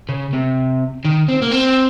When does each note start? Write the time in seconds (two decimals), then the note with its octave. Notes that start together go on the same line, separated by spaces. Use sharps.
0.09 C#3
0.33 C3
1.05 D#3
1.28 C4
1.42 A#3
1.51 C4